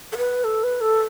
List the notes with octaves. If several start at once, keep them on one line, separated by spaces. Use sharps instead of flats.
A4
B4
A4
B4
A4